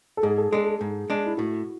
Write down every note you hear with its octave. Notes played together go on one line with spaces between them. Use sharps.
A4
G#2 G#4
A4
G#3 D4 A4
A4
G#2
G#3 D4
E4
A2 F#4